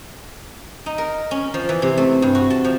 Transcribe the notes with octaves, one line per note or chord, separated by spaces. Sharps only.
D#4
A#4
C#4
F3
E3
C3
A3
G2
F#4
A5
F3